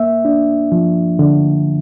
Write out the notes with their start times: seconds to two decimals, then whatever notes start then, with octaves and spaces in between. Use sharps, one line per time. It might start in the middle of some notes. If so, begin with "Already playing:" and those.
Already playing: A#3 E5
0.25 D4
0.72 F3
1.19 D3